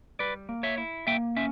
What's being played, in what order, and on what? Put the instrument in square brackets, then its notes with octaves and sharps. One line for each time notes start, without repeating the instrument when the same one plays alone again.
[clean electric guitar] G3 B4 D5
A#3
C#5 E5
E4
A#3 E5 G5
C#4 E5